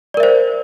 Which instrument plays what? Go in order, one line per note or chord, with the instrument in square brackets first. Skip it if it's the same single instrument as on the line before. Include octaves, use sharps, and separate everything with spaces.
[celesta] D5
A#4
E5
C5